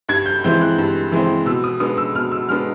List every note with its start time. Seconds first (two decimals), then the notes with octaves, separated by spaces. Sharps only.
0.09 G2 G#6
0.26 G6
0.44 E3 G#3 C4 G6
0.61 F#6
0.78 G2
1.12 E3 G#3 C4
1.46 B2 E6
1.64 D#6
1.80 G#3 B3 D4 D#6
1.97 E6
2.14 B2 F6
2.31 E6
2.49 G#3 B3 D4 F6